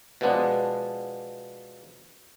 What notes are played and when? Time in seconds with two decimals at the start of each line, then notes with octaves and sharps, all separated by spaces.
0.21 B2 F3 G#3 B3 D4